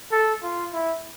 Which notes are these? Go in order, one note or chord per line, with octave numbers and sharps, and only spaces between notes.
A4
F4
E4